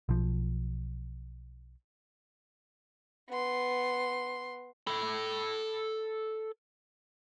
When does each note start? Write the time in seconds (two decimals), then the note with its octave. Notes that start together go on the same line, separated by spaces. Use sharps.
0.09 B1 F3
3.29 B3 C6
4.87 A4 B5